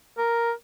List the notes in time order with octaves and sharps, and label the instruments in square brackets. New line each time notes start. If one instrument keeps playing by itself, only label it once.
[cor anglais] A#4